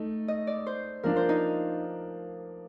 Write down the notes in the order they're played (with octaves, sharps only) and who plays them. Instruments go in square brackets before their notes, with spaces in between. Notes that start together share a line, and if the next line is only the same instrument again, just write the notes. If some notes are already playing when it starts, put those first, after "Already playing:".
Already playing: [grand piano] A3 D#4
[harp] D#5
D5
C5
[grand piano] F3 A#3 D4 F4 [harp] A#4
[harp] C5
D#4